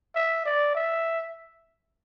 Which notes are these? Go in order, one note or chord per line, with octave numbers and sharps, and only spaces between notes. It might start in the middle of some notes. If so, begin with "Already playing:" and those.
E5
D5
E5